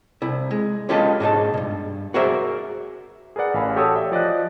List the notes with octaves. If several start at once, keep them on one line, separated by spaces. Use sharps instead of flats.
C2 E4
G#3
C#4 F4 G4 A4 B4 D#5
G#2 B2 D#4 A5
G2 B2
F#4 G#4 A#4 C5 D5 E5
G#4 A#4 B4 D5 F#5
A1 F5 G#5 B5
F#4 G4 A4 C#5 D#6 E6
D5 E5 G5
F3 D5 D#5 F#6